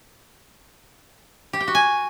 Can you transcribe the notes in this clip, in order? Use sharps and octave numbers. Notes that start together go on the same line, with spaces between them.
G4
G5
F#4
G#5